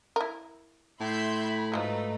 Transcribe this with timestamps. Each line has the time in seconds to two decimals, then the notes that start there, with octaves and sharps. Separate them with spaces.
0.16 E4 A#4
1.00 A2 E5 B5 C6 G6
1.72 G#2 F3 F#3 G#3 A3 D#4 B4